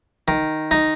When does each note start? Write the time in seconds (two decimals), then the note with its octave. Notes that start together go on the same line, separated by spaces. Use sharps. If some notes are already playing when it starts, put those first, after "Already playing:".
0.28 D#3
0.71 D#4